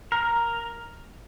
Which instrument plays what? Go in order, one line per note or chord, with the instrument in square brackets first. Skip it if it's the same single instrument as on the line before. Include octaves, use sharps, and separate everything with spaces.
[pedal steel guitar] A#4